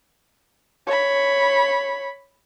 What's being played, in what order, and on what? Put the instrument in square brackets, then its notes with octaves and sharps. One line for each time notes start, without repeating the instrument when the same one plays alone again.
[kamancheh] C#5 B5